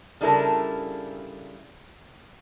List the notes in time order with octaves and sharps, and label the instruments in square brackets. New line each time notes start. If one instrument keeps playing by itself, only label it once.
[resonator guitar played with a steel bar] C#3 G3 D4 E4 A4 A#4